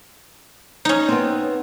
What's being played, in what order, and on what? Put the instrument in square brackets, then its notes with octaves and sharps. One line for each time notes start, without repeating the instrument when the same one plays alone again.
[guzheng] C#4 D#4
[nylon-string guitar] B3 C4